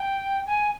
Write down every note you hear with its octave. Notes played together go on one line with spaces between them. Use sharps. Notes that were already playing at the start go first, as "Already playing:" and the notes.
Already playing: G5
G#5